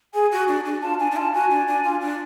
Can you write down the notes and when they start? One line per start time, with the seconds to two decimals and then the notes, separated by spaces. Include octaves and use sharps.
0.14 G#4 G#5
0.32 F#4
0.48 D4
0.65 D4
0.82 F4 A5
0.99 D4 G#5
1.11 D4
1.16 F4 A5
1.33 F#4 G#5
1.50 D4
1.68 D4
1.84 F4
2.01 D4